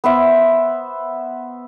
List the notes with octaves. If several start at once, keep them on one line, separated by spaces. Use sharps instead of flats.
B3 C5 E5